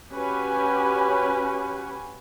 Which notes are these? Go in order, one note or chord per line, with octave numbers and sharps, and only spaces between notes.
C#4 F#4 G4 B4 G#5